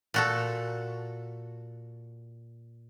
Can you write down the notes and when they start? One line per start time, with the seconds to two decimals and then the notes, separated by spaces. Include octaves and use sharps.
0.14 A#2 F#4 A4